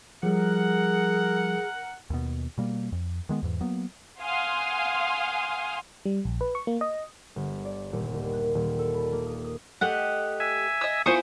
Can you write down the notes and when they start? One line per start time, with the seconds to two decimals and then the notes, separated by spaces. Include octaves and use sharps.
0.23 F3 G3 G#4 A#4 F#5
2.10 D#2 B2
2.58 B2 G3 A#3
2.92 F2
3.29 D#3 G#3 B3
3.42 E2 G#2 E3
3.60 F#3 A#3 B3
4.19 F5 F#5 G#5 C6 D#6 F6
6.05 G3
6.25 A#1
6.41 B4
6.55 C#6
6.67 A#3
6.81 D#5
7.36 G1
7.65 D5
7.93 D#1
8.14 D#2
8.33 F#6
8.55 D#1
8.79 A4
8.94 B5
9.13 A#3
9.27 D#6
9.44 D#6
9.81 A3 G4 D#5 F#5
10.40 E5 G#5
10.81 D#5 E6
11.06 B3 E4 F4 C5 G#5 C#6 D#6